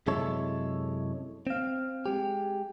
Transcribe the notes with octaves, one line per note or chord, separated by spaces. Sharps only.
F#2 C3 G#3 E4 A4 C#5
C4 F5
G#3 G4